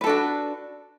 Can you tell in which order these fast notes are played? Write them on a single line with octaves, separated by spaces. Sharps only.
B4 A4 D4 F#4